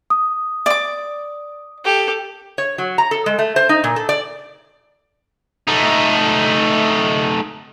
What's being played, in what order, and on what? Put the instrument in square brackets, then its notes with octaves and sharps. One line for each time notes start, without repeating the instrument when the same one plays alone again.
[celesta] D#6
[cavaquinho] D5 D6
[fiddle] G4 A4
[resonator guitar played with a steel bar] C#5
F#3
A#5
A4
G#3
A3
C5
D#4
A#2
A4
D5
[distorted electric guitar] A3 D#4